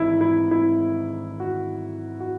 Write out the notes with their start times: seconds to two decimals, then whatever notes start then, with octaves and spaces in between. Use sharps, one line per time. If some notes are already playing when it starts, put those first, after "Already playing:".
Already playing: G#1 G#2 E3 E4
0.21 E4
0.51 E4
1.40 F#4
2.20 F#4